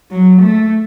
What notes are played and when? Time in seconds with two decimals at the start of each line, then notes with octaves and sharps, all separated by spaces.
0.11 F#3
0.43 A3